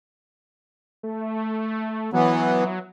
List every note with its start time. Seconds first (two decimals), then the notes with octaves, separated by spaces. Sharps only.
1.03 A3
2.13 E3 F#3 B3